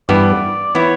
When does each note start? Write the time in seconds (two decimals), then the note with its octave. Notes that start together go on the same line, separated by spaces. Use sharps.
0.09 G2 E3 B3 E4 D5
0.75 E3 B3 E4 C#5